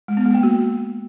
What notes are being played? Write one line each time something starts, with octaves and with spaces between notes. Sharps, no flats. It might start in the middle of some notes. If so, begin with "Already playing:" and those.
G#3
B3
G#3
A#3
F#4